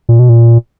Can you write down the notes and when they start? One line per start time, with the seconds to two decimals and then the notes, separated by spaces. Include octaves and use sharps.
0.09 A#2
0.19 B2
0.29 A#2